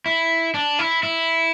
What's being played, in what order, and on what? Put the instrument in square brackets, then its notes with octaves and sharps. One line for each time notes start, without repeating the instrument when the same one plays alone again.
[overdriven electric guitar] E4
D4
E4
E4